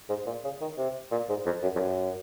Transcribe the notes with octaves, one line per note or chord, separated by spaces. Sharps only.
G#2
A#2
C#3
D#3
C3
A#2
G#2
F2
F#2
F2
F#2